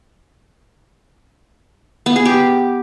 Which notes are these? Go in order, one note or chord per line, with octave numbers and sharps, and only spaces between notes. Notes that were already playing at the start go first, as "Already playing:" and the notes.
B3
G#4
G4